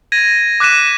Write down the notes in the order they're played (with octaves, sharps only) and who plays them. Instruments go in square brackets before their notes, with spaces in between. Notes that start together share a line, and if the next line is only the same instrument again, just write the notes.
[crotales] G#6 A#6 D#7
D6 F#6 B6 D#7 E7